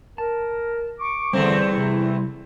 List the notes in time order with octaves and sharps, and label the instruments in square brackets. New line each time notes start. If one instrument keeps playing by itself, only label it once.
[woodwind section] A#4 [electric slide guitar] A5
[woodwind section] C#6 D6
[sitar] E2 A3 C4 [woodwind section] D3 [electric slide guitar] G3
[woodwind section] C3 E4